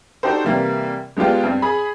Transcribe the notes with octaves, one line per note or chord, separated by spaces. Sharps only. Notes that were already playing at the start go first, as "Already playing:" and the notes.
D4 D#4 F#4 G4 A4 C5
C3 E3 G3 A#3
G#3 B3 D4 F4 G4
G2 C4
G#4 B5